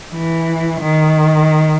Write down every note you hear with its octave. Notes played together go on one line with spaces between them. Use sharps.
E3
D#3